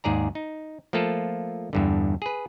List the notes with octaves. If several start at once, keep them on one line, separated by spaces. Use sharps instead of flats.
D#2 G#2 G#4 D5 A#5
D#4
F3 A3 A#3 F4 A4
E2 G2 D3
G#4 B4